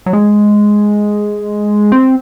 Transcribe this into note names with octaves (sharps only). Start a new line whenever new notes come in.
F#3
G#3
C4